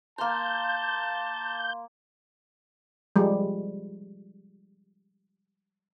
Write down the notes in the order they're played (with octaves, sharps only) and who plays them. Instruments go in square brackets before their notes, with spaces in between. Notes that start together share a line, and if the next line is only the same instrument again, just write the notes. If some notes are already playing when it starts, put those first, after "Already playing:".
[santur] A#3 A#5 [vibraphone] F5 C6 [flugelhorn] A5 [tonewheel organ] G6
[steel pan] F3 G3 G#3